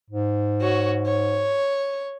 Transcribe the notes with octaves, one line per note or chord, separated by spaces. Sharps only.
G#2
F#4 C#5
C#5